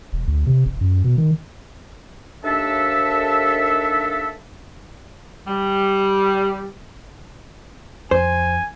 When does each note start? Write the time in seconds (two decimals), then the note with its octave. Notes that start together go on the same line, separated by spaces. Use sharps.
0.13 E1
0.27 D2
0.47 C3
0.66 F1
0.81 F#2
1.04 B2
1.17 D#3
2.44 D#2 D4 A4 E5
5.47 G3
8.11 F2 C5 G#5